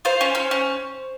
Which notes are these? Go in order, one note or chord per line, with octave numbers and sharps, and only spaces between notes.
F4 C5
C#4
C#4
C#4